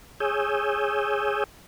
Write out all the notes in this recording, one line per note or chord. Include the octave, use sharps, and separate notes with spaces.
G#4 C#5 G#5 D#6 E6 G6